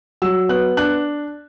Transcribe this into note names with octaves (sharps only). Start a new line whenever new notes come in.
F#3 E6
B3 F#6
D4 F#6